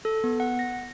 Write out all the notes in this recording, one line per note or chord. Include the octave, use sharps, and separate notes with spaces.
A4
B3
F#5
A#6